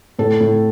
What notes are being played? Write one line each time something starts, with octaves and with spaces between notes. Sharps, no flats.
A2 A4
A2